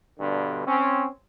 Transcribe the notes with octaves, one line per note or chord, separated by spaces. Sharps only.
G2 B2 D3
C4 C#4